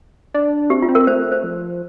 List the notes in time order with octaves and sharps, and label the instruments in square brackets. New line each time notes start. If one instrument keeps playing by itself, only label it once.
[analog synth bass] D4
[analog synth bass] C4 [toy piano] G4
[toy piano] F4
[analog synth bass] C4
[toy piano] A#4
[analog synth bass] A3 [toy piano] C5
[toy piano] C5
[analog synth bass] F3